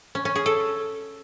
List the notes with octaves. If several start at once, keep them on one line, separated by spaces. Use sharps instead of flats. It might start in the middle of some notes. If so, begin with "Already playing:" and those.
C#4
C#4
G#4
A4